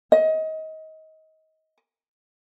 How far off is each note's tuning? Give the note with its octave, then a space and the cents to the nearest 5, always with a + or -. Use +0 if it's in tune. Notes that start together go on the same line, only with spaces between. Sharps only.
D#5 +25